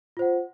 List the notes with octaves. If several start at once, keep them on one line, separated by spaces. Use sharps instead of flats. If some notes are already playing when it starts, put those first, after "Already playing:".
F4 C5 F#5